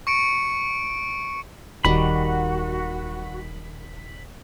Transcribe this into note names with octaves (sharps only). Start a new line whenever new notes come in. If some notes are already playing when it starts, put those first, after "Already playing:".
C#6 C#7 D7
D#1 D#3 G3 F#4 B5